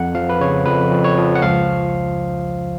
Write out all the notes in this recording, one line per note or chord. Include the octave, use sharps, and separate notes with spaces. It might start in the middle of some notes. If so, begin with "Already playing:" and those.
Already playing: F2 F#5
F3 F5
B4
C#3 C#5
F2 B4
F2
C#5
F3
F#5
C#2 F5